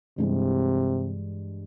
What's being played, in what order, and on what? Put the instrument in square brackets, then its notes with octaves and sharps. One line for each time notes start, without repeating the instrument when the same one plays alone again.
[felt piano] G2 E3 G#3 [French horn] C3